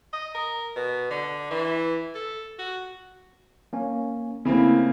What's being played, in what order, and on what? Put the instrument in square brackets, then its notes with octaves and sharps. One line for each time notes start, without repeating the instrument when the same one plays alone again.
[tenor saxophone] D#5
A#4
B2
D3
E3
A4
F#4
[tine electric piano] A#3 C#4
[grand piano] C#3 A#3 C4 [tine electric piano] A3 E4